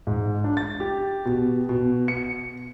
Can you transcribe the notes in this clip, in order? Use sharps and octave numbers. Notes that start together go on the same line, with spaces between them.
G#2
D4
A6
G4
B2
B2
C#7